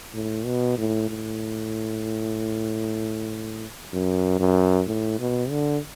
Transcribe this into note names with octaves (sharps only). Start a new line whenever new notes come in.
A2
B2
A2
A2
F#2
F#2
A2
B2
D3